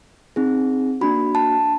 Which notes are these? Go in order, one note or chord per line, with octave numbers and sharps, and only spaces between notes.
C4 D#4 G#4
A#3 D4 F#4 B5
A5